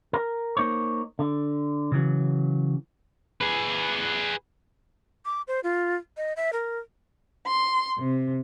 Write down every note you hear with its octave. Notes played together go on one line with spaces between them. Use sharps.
A#4
A#3 D#4 C5 C#5
D3
C#3 E3 F#3
G#4 B4
D6
C5
F4
D#5
E5
A#4
C6
C3